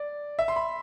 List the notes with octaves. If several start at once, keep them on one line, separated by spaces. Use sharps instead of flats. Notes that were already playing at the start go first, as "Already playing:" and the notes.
Already playing: D5
E5
C6
B5